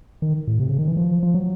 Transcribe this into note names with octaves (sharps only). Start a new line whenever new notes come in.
D#3
A2
C3
C#3
D#3
E3
F3
F3
F#3